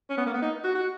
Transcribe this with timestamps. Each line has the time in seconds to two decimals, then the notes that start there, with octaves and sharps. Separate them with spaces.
0.10 C#4
0.18 B3
0.26 A#3
0.34 B3
0.42 D#4
0.64 F#4
0.75 F#4